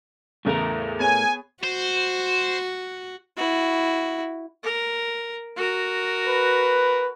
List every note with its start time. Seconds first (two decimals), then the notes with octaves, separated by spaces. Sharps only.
0.45 E2 A2 C#3 A3 A#4
1.00 B3 G#4 C#5 G#5
1.64 F#4 C5
3.37 E4 F#4
4.63 A#4
5.56 F#4 A#4
6.27 B4